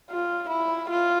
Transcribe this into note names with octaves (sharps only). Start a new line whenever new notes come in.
F4
E4
F4